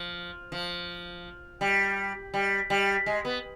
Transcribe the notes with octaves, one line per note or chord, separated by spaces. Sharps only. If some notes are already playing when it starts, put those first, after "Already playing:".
Already playing: F3
F3
G3
G3
G3
G#3
B3